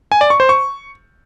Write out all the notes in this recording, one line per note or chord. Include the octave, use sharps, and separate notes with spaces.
G#5
D5
C#6
C5
C#6